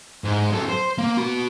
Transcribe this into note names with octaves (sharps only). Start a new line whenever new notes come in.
G#2 G#3
F#2 A4
C5
A#3
F#4 B5